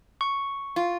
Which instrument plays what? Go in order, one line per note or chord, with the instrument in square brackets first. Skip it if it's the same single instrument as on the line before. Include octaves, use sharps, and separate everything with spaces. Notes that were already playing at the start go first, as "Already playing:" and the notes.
[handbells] C#6
[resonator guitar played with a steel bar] F4